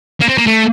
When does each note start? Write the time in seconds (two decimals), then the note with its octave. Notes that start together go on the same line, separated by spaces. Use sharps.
0.21 A#3
0.29 C4
0.38 A#3
0.47 A3